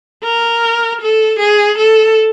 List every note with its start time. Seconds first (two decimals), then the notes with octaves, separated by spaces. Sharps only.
0.24 A#4
1.01 A4
1.39 G#4
1.78 A4